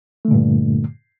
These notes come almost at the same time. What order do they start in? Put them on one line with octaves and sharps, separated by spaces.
A3 D3 A#2 G2